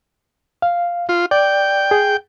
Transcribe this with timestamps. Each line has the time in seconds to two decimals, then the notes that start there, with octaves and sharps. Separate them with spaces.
0.62 F5
1.09 F4
1.31 D5 G5
1.91 G#4